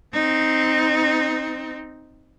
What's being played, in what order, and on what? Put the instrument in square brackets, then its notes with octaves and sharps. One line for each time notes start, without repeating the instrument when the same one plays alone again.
[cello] C4 D#4